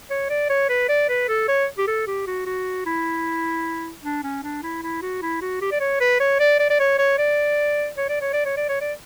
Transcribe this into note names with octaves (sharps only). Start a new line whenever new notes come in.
C#5
D5
C#5
B4
D5
B4
A4
C#5
G4
A4
G4
F#4
F#4
E4
D4
C#4
D4
E4
E4
F#4
E4
F#4
G4
D5
C#5
B4
C#5
D5
D5
D5
C#5
C#5
D5
C#5
D5
C#5
D5
C#5
D5
C#5
D5